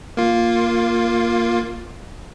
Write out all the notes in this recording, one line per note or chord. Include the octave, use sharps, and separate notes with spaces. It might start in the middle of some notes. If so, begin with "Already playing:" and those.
A#3 F4